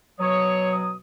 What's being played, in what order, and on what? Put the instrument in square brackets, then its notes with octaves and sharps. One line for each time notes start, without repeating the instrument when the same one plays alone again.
[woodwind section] B2 F#3 D#6 [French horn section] C#5